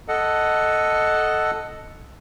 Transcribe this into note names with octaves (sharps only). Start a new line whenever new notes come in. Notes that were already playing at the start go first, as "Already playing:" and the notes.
A4 D#5 F#5